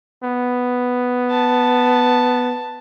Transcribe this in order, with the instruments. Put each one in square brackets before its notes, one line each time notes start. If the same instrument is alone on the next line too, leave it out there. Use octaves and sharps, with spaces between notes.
[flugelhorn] B3
[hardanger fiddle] A5